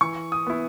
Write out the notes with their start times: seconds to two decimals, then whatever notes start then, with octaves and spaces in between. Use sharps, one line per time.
0.01 E3 C#6
0.32 D#6
0.47 B3 E4